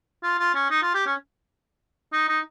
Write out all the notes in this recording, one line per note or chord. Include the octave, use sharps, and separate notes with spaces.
F4
F4
C#4
D#4
F4
G4
C#4
D#4
D#4